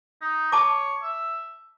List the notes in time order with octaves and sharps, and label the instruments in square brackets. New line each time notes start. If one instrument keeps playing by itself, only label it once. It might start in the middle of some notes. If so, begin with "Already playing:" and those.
[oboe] D#4
[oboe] C#5 [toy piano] A5 D6
[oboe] E5